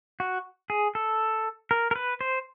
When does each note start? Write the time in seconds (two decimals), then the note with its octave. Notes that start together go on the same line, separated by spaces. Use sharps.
0.20 F#4
0.70 G#4
0.95 A4
1.71 A#4
1.91 A#4
1.96 B4
2.21 C5